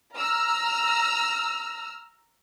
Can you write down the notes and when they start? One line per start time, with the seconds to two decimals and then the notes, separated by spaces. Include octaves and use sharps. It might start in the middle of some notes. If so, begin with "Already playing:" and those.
0.16 A#5 E6 F6